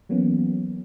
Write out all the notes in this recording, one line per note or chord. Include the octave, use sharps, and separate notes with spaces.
E3 F#3 A#3 B3 C#4